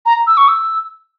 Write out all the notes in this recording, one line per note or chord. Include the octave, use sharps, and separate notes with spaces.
A#5
E6
C#6
E6